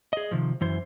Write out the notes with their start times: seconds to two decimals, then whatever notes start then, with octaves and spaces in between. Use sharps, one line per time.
0.13 G#4 D#5
0.31 C3 D#3 F3
0.61 F#2 E3 C5